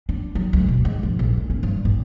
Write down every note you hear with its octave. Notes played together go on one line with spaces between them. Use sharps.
D4
F#3
D2
B2
G#3
F3
A#1
D#3
C#4
G2
A1